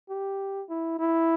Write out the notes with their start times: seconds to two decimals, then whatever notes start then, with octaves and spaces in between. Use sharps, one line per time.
0.10 G4
0.70 E4
0.99 E4